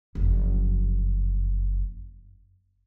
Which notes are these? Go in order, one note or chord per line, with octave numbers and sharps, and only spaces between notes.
F#1 F2